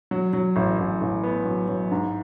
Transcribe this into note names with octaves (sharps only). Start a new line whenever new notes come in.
F#3
F#3
A1
A1
A1
B3
F#3
F#3
G#2